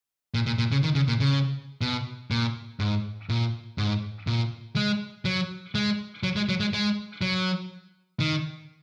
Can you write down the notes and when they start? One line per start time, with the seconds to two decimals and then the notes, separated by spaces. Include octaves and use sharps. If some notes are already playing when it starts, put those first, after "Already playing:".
0.34 A#2
0.46 A#2
0.58 A#2
0.72 C#3
0.83 D#3
0.95 C#3
1.08 A#2
1.20 C#3
1.81 B2
2.31 A#2
2.80 G#2
3.29 A#2
3.78 G#2
4.27 A#2
4.76 G#3
5.25 F#3
5.75 G#3
6.23 F#3
6.36 G#3
6.49 F#3
6.60 G#3
6.73 G#3
7.21 F#3
8.20 D#3